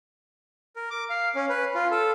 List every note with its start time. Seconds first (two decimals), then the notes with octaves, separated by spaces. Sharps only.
0.76 A#4
0.91 D6
1.10 F5
1.35 C#4
1.49 B4
1.75 F4
1.91 A4